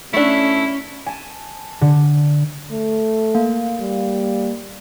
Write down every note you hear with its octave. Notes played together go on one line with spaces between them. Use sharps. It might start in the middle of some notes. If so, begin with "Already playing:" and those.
A3 C#4 D4 E4
G#5 A5
D3
A3
A#3
G3